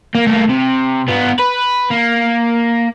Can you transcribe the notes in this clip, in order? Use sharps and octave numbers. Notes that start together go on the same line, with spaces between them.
A#3
A3 A#3
C3
B3 F4
B4
A#3